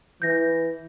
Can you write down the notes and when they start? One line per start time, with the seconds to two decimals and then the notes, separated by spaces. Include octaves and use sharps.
0.22 E3 G6 A#6